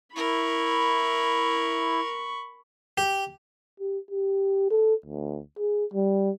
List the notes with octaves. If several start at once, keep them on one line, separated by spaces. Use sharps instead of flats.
E4 A#4 B5 C#6
G4
G4
G4
A4
D2
G#4
G3